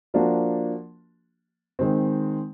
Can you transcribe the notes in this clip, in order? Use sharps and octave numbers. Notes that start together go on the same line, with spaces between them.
F3 A#3 D4 F#4
D#3 G#3 C4